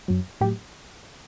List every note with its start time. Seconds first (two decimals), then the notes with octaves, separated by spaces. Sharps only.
0.08 F#2 F#3
0.41 A2 F#3 G4